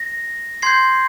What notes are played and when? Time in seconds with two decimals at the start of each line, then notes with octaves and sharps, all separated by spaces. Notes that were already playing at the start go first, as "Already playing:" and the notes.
Already playing: A#6
0.62 C6 G6 G#6 C7